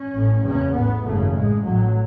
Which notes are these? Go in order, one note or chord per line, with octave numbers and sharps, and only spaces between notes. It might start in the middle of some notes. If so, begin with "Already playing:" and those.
Already playing: C#4
A1 A2
F#1 E2 C#3 C#4
A1 A2 B3
G#1 F#2 C#3 A3
A1 A2 G#3
A1 A2 F#3